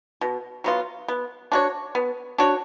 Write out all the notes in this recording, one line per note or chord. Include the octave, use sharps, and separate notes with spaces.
B2
F#3 B3 F4
B3
D4 F#4 C#5
B3
D4 F#4 C#5